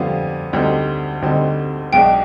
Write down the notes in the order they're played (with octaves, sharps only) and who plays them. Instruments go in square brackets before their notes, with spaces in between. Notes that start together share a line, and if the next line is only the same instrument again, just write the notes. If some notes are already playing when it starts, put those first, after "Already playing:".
Already playing: [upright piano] F2 D3 G3 B3 D4 [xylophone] F5
[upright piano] D2 D3 G3 C4 D#4
D2 D3 G3 C4 D#4
[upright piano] B1 B2 G#3 D4 [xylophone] G5